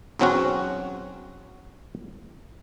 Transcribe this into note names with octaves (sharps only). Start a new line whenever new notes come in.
B1 E2 F#3 C4 C#4 F#4